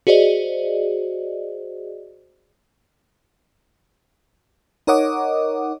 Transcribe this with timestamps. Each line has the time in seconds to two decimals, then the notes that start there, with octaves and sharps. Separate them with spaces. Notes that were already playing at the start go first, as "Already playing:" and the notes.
0.07 F#4 G#4 C5 D5 D#5
4.87 D#4 A#4 C#5 D#5 F#5 D6